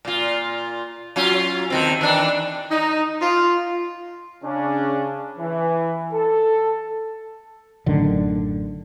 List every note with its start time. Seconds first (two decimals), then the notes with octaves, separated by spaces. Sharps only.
0.05 A#2 F4
1.16 F#3 C#4 F4
1.70 D#2 D#3 C4
2.01 D#3 E3 D4
2.71 D#4
3.22 F4
4.44 C#3 C#4 D4
5.39 E3
6.13 A4
7.86 A1 F#2 D3 D#3